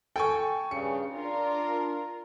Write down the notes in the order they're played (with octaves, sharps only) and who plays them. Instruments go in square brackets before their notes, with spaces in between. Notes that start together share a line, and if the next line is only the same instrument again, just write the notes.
[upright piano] A4 G#5 C#6 [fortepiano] G5
[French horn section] G2 C#3 [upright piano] C#7
[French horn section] D4 [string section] F4 A#4